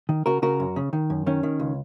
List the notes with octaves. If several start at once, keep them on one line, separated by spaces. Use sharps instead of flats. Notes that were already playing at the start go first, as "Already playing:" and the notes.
D#3
C#3 F#4 A#4
C#3 F#4 A#4
F#2
C#3
D#3
F#2
D#3 C#4
D#3
C#2